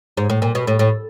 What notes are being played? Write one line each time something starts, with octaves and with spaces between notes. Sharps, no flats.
G#2
A2
A#2
B2
A2
A2